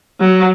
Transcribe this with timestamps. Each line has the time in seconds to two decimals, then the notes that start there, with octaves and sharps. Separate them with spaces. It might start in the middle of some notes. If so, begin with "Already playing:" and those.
0.20 F#3